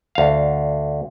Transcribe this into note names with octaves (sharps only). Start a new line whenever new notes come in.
D2 F5